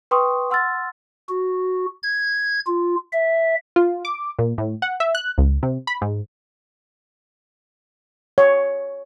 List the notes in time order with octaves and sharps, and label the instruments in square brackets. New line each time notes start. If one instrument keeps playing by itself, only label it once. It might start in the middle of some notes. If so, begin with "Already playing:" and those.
[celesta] B4 G5 C6 C#6 D#6
F#5 C6 E6 F6 A6
[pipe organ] F#4
G#6
F4
E5
[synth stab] F4
D6
A#2
A2
F#5
E5
F#6
C#2
C3
B5
G#2
[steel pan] C#5